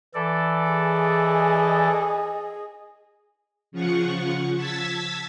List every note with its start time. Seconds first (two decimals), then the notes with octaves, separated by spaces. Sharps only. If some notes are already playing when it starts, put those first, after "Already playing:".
0.14 E3 A4 D5
0.72 G#4 D#5
3.72 C#3 F3 F4 F#5 C#6
4.57 A5 E6 G#6 A6 B6